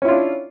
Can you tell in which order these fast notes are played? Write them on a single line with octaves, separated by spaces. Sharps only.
C#4 E4 F4 D4